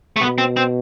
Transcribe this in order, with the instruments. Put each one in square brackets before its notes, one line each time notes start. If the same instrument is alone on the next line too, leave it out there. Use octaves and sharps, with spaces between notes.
[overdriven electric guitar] A3
[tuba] B2 [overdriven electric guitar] B3
[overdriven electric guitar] C4
C4